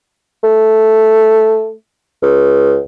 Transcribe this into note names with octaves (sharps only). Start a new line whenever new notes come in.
A3
C#2